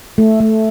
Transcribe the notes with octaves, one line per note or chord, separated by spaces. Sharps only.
A3
A3